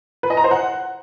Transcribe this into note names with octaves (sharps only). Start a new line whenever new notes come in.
B4
D#5
A#5
C5
F#5